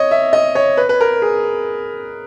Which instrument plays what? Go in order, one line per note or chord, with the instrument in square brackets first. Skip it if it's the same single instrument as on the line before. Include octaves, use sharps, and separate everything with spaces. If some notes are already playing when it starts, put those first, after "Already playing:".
Already playing: [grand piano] C#5 D#5
E5
D#5
C#5
B4
B4
A#4
G#4